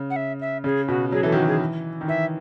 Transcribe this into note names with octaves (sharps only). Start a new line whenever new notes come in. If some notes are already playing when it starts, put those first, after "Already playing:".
Already playing: C#3
F#5
E5
E5
C#3 G#4
B2 F#4
F#3 G#4
E3 A4
D#3 F#4
E3 G#4
D#3
E3 E5